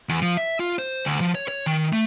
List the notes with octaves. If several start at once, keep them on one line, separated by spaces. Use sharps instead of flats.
E2
F3
E5
F4
C5
D2
F3
C#5
C#5
D#3
A3